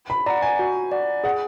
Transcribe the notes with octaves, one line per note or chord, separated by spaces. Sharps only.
B5
D5 F#5 A#5
G#5
F#4
D5 F#5
G#4 F#5